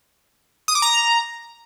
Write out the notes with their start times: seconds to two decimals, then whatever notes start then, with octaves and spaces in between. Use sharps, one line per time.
0.68 D#6
0.75 D6
0.82 A#5